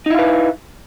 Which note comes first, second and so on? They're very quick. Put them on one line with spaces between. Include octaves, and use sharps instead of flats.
D#4 E4 F5 B4